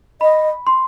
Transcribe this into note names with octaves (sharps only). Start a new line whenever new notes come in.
D#5 B5
C6